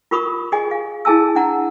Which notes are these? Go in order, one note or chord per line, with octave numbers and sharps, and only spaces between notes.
F4 G4 A#4 B5 C#6 D#6
G4 G#4 D#5 G#5 D6
F5
E4 G#4 G#5 A5 E6
D4 F#5 A#5